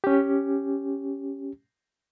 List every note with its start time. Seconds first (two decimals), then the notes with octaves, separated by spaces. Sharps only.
0.04 C#4 G4